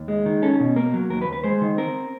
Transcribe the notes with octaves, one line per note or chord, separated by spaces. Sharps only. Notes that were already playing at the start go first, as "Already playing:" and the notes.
Already playing: D#2
G#3
D#3
C#4 A4
B2
A#3 A#4
F#3
D#2 A#4
B4
D#2
B4
G#3 C5
D#3
C4 A#4